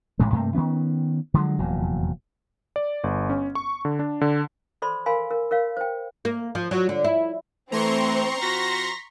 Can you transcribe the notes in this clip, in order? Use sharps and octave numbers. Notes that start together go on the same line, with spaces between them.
A1 A2 C#3 G#3
G2 C3 A3 A#3
D#3 E3 B3 C#4
D3 F3 F#3 G#3
F1 E2 A#2 F#3
D5
G1
C#4
C#6
D3
D4
D3
A4 C5 D5 B5 C6
A#4 F5 G#5 B5 C6
A#4
A#4 C#5 F5
C5 G5
A#3
F3
F#3
D3
E4
E3 A3 C4 A#5 C6 C#6
F3 C4 F#4 A#6 B6